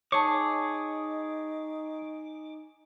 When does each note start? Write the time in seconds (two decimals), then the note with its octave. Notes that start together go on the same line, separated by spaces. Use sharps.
0.12 D#4 G#4 C#5 A5 C#6 D6